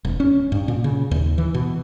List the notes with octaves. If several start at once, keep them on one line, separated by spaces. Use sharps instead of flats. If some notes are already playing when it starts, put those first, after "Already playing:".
E1
C#4
G2
A#2
C#3
D#2
E3
B2